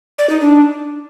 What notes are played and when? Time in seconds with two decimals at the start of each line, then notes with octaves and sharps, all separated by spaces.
0.18 D5
0.30 D#4
0.41 D4